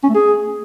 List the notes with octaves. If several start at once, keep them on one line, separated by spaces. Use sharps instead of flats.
C#4
A3
G#4